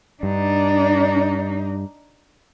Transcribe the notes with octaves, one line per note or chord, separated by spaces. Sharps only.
G2 D4 D#4